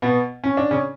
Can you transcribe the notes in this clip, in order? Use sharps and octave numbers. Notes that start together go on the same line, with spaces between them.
B2 B3
C#4
D4
C#3 C#4